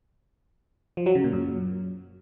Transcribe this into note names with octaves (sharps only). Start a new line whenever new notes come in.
F3
F#3
C#3
A#2
F#2